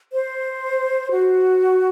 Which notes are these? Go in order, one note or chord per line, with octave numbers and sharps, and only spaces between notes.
C5
F#4